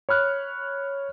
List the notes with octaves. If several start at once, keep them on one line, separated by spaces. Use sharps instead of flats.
C#5 B5 F6 F#6